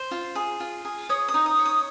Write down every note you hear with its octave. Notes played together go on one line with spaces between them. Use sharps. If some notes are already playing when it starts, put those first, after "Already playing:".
Already playing: C5
F4
G#4
F4
G#4
C#5 D#6
D#6
D#4
D#6
C#5
D#6